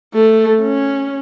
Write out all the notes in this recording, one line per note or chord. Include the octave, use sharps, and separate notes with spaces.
A3
C#4